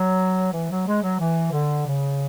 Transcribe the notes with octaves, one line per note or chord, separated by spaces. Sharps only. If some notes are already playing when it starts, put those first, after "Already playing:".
Already playing: F#3
E3
F#3
G#3
F#3
E3
D3
C#3